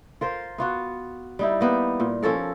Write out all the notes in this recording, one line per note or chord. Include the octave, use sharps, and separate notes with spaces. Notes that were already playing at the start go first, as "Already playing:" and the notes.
F4 A#4 C5
B3 F4 F#4
G3 D#4 E4
A#3 B3 G4
A#2
F3 C#4 A4 A#4